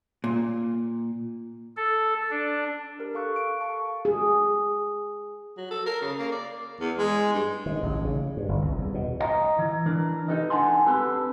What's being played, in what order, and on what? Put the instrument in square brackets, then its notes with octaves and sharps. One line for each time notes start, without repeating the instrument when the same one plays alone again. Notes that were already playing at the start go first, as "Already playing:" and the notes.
[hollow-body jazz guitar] A#2
[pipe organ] A4
D4
[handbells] G4 A#4
A4 F5 C#6 F#6
D7
F5 A5 C#6
[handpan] G#4
[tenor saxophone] F#3
A4
A#4
C#3
A#3
D5
[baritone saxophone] E2
G#3
G2
[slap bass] D#3
A1
C#3
G2
G1
C2
E2
B2
[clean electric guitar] D#5 A#5
E3
E3 D4 A#4
D#4 G4 A4 B4 D#5
D4 A4 F#5 G#5 A5 C6
C4 G4 A4 B4